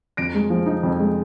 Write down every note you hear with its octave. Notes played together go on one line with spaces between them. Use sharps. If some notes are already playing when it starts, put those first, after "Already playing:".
F2 A#6 D7
G#3
F3
D#4
F2
G#3